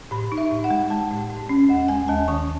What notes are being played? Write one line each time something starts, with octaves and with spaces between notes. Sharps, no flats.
A2 B5
D#4
E5
A2
F#5
G#3
G#3 A5
A2
A2
C#4
D#2 F#5
G#3 G#5
D#2 A5
D#3 C#6